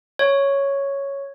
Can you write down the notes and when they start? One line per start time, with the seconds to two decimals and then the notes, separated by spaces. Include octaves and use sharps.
0.19 C#5